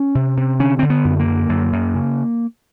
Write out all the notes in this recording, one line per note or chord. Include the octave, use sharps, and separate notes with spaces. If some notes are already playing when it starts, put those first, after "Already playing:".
Already playing: C#4
C3
C3
D3 C#4
D3 C4
B3
F#2
A#3
D3
F#2
F#2
C#3